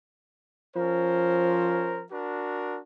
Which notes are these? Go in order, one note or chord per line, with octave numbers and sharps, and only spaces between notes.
F3 C#4 A#4 C5
D4 F#4 A#4